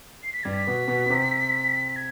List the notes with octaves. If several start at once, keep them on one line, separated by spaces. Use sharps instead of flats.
C7
B6
G2 G3 G#6
B6
B2 B3
B2 B3
B3
C3 C4
B6
G#6